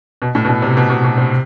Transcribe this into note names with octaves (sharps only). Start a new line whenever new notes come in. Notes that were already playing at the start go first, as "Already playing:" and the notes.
B2
A2
B2
A2
C3
B2
B2
B2
C3